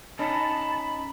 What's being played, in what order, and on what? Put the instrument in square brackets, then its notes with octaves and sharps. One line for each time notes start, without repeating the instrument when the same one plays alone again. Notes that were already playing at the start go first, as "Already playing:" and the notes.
[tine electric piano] C#4 [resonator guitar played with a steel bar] D#4 [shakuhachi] A5 [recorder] B5